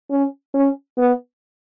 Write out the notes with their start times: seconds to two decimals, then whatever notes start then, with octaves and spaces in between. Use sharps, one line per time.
0.11 C#4
0.54 C#4
0.98 B3